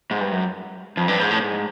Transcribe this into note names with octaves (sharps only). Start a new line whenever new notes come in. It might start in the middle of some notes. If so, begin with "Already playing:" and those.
G#2
G2
F#2
F2
G2
G#2
A2
G#2